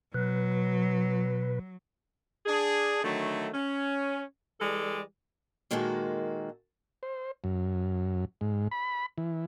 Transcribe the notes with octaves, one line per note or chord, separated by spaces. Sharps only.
B2 F#3 B4
D4 G#4
D3 D#3 F#3 A3
C#4
E3 G3 G#3 A4 D5
A#2 D#3 G#3 A#3 F#4 A4
C5
F#2
G#2
B5
E3